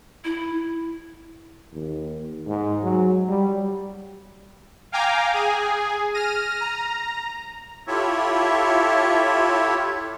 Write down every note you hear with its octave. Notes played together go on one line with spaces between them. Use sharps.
E4
D#2
G#2
F#3
G3
F5 G5 G#5 A#5 D6
G#4 G#5
F6 A#6 D#7
A#5
E4 F4 G4 A4 C#5 E5